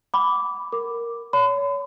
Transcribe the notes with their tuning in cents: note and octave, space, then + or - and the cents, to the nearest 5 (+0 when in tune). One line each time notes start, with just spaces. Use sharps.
F#5 +20 B5 +5 D6 -10
A#4 +0 D6 +0
C#5 +30 B5 +45